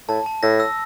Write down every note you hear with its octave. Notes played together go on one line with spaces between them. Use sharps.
A2 A5
A5
A2 A#6
E6